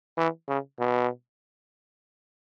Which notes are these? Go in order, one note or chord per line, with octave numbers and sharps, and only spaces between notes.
E3
C#3
B2